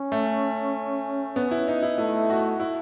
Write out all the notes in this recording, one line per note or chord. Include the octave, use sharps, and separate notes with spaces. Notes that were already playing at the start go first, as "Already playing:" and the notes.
Already playing: C#4
A3
B3
E4
D#4
E4
A3 E4
F#4
E4